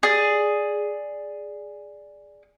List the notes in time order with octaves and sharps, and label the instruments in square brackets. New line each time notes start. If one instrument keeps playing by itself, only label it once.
[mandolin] G#4 D5